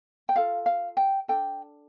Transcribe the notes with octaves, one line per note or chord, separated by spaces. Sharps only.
G5
F4 A4 F5
F5
G5
D4 A4 G5